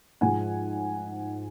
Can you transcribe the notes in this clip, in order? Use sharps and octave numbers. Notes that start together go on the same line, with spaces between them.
G#2 F3 G#3 F#5 G#5